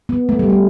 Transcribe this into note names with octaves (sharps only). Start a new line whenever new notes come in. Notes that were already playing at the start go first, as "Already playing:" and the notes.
B3
A3
G3
A3